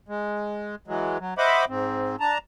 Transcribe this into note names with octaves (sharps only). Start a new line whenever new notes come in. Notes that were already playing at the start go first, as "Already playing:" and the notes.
G#3
E3 F#3 G#3
F#3
C5 D#5 E5 F#5 B5 D6
G#2 C4
D4 A5 A#5